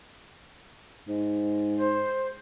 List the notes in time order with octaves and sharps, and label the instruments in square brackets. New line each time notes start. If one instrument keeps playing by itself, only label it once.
[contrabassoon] G#2
[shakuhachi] C5